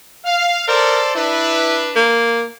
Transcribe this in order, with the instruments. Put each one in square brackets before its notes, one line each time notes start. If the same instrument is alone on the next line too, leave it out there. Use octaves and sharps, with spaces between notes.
[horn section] F5
[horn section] A4 C5 D5 [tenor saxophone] A#4
[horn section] D4 B4 [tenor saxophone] E4
[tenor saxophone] A#3